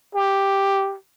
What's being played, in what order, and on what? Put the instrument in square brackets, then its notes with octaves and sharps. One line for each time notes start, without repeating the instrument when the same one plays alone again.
[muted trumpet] G4